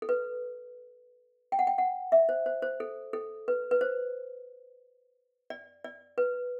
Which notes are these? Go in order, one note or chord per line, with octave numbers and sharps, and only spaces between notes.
A4
B4
G5
F#5
G5
F#5
E5
C5
C5
C5
A4
A4
B4
B4
C5
D5
D5
B4